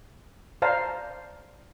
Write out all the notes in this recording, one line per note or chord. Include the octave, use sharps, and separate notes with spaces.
C5 D5 F5 A5 A#5